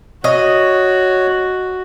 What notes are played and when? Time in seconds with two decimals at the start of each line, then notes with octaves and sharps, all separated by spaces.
0.24 F#4 C#5 D#5